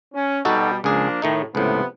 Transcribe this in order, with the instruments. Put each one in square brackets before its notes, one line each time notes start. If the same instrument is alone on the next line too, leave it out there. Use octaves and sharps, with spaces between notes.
[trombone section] C#4
[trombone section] B2 G3 [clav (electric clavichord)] D#4 F#4 A4
[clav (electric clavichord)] C#2 G#4 [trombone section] F3 A#3 D4
[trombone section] A2 [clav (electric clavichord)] D#3 A3 D#4
[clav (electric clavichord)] C#2 A2 [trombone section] C3 F3 B3